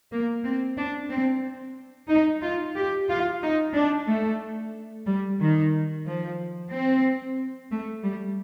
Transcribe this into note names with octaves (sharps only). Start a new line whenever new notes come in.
A#3
C4
D4
C4
D#4
F4
G4
F4
D#4
D4
A3
G3
D#3
F3
C4
A3
G3